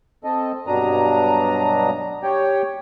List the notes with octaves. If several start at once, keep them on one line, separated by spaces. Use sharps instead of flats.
C4 A4 D#5
G2 B2 F#3 D4 A#5 D#6
G4 C#5 G5